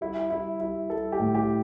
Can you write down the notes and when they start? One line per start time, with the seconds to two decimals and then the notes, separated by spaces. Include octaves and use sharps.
0.01 G3 E4
0.30 G3 E4
0.60 G3 E4
0.90 G3 A4
1.12 G4
1.19 A2
1.35 G4